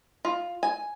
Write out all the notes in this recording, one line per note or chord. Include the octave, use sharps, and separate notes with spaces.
F4
G#5